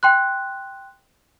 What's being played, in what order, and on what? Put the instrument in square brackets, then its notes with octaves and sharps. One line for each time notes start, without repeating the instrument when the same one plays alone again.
[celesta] G5 C6 F#6